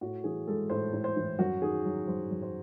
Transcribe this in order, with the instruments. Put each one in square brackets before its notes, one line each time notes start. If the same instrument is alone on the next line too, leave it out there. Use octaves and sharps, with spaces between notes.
[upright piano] A2 F#4
E3 G#4
G#3 A4
A2 C5
A2
C5
E3
F#2 F#4
D#3 G#4
F#3
F#2 C5
F#2
C5